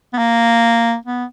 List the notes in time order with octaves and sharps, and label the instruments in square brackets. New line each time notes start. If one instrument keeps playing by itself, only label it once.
[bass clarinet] B3
A#3
B3